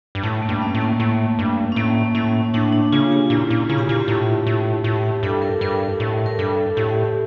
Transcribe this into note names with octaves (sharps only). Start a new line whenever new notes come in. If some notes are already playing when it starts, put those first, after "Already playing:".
G2
A2 A3
A#3
G2
C#4
A2
A#3
A2 A3
G2
C#4
A2 A#3
A2 C#4
A2 D4
D4
C#3 F4
G4
A#2 E4
A#2
C#3 F4
G4
A#2 F4
A2
A2
A2 G4
G4
G2 A4
A#4
G2 A#4
A2
A#4
G2 A4
A2 G4